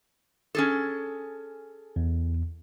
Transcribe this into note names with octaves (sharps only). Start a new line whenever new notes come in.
C#4 G#4 A4
E2